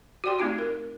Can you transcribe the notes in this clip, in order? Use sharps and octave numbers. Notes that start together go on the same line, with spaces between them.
F#4 G4 D5 G5 C6
A3 C4 D#4 F4 F#4
A#4